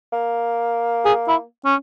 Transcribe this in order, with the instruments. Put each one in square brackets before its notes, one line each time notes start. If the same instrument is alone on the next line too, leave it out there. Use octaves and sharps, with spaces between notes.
[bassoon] A#3
[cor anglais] G#4
E4
C#4